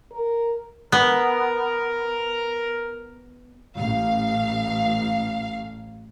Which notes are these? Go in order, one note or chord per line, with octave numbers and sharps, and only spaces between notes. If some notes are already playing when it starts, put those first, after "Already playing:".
A#4
B3 A#4
A1 F5